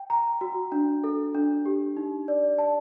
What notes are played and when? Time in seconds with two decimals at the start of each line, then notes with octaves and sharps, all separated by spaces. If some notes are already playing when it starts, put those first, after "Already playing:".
Already playing: G5
0.10 A#5
0.41 F#4
0.72 D4
1.04 A4
1.35 D4
1.66 G4
1.97 D#4
2.28 D5
2.58 A5